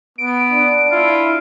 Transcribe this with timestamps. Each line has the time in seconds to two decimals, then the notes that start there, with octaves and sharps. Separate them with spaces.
0.18 B3 D7
0.52 D4
0.91 E4 F4